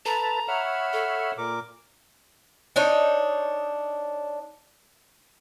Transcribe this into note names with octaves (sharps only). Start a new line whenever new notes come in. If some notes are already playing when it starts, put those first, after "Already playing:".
A4 B4 A5 A#5
C#5 E5 F#5 B5 F6
A4
A#2 A#4 D6
D4 D#4 C#5